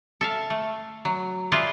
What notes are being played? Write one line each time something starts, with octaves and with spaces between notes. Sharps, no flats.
A4 E5 F5
A3
F#3
E4 F4 G#4 B4 C5 D5